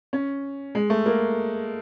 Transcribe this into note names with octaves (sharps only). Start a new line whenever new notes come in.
C#4
G#3
A3
A#3